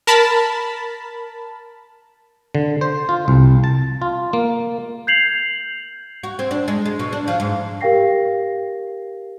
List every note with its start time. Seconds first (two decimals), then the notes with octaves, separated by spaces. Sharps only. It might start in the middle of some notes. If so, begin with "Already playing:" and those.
0.07 A#4 A5 B5
2.55 D3
2.81 C5
3.09 F4
3.28 C2
3.64 A5
4.02 F4
4.33 A#3
5.07 G6 G#6 C7 F7 F#7
6.23 F#4
6.39 C4
6.51 D4
6.68 G#3
6.86 G#3
6.99 B2
7.13 D4
7.28 F3
7.40 G#2
7.81 G4 A#4 F5 G5 A#6 C7